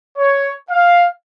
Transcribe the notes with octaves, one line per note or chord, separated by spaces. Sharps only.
C#5
F5